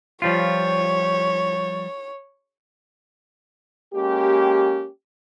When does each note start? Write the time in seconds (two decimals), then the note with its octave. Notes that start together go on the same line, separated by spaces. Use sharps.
0.22 F3 G3 F4 C#5
3.94 G#3 A#3 C#4 G4